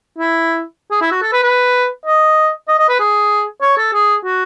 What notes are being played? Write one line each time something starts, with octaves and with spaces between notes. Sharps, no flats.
E4
G#4
E4
F#4
A4
B4
B4
D#5
D#5
D#5
B4
G#4
C#5
A4
G#4
F#4